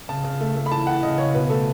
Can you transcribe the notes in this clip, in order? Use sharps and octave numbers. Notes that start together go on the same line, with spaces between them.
C#3 A5
C#3
A3
A3
B5
E3 A5
E3 F#5
C#3 D#5
C#3 C#5
B2 B4
A3 A4